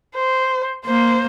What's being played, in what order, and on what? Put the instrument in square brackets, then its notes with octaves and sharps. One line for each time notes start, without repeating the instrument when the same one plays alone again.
[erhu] C5
[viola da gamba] A#3 [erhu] C5